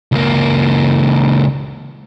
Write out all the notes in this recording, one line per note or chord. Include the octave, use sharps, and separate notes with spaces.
C#2 A#3